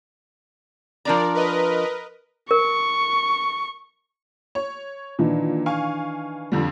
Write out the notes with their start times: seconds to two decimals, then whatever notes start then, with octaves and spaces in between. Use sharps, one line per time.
1.05 F3 D4 A#4 D5 A#5
1.34 A#4 B4 D#5
2.51 A#4 C#6
4.55 C#5
5.19 A#2 D#3 E3 D4
5.66 F5 G#5 C#6
6.52 F2 D3 G3